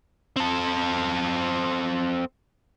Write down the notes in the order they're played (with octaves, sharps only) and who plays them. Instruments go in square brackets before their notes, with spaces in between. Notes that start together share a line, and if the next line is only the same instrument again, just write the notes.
[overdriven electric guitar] C4 A4